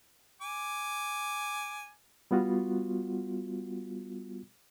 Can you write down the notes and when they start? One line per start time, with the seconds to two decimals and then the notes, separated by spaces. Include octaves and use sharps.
0.41 G#5 D6
2.31 G3 B3 F4 F#4